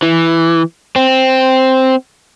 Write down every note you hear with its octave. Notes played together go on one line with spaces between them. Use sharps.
E3
C4